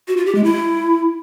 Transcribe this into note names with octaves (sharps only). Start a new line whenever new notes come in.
F#4
F4
G4
G#3
E4